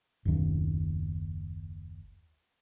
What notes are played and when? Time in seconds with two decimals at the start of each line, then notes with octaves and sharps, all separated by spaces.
0.25 F#1 D#2